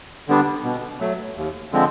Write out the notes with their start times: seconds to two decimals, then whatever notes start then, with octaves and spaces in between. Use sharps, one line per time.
0.28 D3 G3 B3 D4
0.64 B2
1.00 F#3 A3
1.36 D#2
1.72 D3 F3 G#3 C4